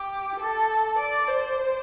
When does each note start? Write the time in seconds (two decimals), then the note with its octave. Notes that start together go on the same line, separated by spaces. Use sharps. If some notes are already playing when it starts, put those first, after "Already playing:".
Already playing: G4
0.40 A4
0.98 D5
1.27 C5